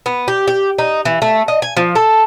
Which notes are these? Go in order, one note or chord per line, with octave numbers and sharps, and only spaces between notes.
B3
G4
G4
D#4
E3
A3
D#5
G#5
F3
A4